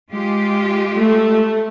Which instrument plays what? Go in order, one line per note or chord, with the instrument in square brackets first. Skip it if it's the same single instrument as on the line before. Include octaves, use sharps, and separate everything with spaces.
[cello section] G#3 F4 G4
[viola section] A3